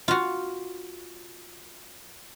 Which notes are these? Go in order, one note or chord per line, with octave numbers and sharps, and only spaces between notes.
F4 F#4